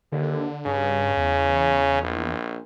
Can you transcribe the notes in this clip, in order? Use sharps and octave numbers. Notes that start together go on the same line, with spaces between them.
D#2 D3
G2 C#3
E2
A#1